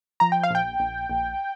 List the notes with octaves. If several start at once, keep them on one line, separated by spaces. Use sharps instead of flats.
F3 A#5
G5
F5
A#1 G5
A#1
A#1